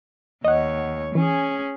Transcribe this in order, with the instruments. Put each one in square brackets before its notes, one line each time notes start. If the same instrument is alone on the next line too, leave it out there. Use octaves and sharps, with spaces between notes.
[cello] D#2 C#5 [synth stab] D#5 F#5
[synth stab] E3 [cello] C#4 G#4